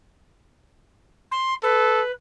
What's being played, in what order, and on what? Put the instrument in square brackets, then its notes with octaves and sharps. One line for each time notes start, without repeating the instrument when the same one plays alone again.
[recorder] C6
[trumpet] A4 [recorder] B4